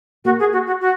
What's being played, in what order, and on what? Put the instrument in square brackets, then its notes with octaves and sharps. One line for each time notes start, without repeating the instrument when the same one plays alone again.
[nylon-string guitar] A#3 [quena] F#4
[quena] G#4
F#4
F#4
F#4